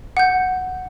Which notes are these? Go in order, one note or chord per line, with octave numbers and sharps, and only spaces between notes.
F#5 G6